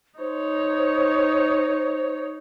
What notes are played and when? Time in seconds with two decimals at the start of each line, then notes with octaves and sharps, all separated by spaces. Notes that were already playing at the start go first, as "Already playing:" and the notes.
0.19 D#4 C5 C#5